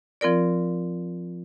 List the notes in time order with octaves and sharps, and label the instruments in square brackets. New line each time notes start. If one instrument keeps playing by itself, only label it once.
[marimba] F3 C4 F4 A#4 D5